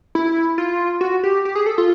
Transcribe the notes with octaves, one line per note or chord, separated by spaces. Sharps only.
E4
F4
F#4
G4
G4
G#4
A4
F4